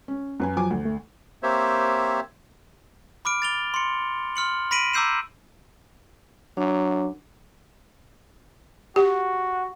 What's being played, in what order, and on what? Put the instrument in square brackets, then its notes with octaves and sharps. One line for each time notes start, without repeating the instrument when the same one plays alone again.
[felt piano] C#4
F#2 B4 G#5
[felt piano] F3 G#5 D6 [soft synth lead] F#3
[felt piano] D2
[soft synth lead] A3
[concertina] A#3 C4 G4 C5 C#5 E5
[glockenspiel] B5 D6 F6 D7
A6 F7 G7
C6 C#7
C6 F6 C#7 F#7
B5 A#6 B6 D7 D#7 F#7
A#5 D6 E6 G6 C7 E7
[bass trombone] F#3 [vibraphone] D4
[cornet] F#4 [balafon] G4